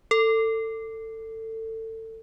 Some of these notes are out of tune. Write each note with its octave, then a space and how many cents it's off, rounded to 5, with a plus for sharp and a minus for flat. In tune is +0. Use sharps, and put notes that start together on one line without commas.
A4 +25